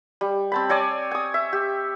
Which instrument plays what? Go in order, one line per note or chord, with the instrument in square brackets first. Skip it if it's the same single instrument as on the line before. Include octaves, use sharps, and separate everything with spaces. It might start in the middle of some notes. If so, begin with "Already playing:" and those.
[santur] G3
C4 A5 B5
C4 C#5 D5 G#5
G#5 D#6
E5
G4